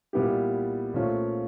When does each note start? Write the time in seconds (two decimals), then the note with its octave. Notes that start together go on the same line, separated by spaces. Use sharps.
0.13 A#2 G3 B3 E4 G4
0.94 A#2 F3 A3 C#4 F4